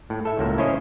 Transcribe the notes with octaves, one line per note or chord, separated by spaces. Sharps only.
A2
A4 E5
C#2 A2 F#3 A#3
C#4 E4 C5 C#5 D#5